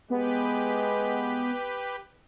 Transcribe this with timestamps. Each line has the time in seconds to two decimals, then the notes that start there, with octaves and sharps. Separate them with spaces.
0.10 G#3 B3 G4 B4